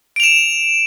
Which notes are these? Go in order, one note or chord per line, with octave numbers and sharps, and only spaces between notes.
D7 E7 F7